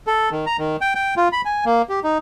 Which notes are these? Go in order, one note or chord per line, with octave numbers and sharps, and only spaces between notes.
A4
D#3
A#5
D#3
G5
G5
F4
B5
G#5
A#3
G4
D#4